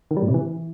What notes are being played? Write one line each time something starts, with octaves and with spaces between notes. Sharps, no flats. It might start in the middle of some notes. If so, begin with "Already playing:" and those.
D#3
G3
A2
C3
E3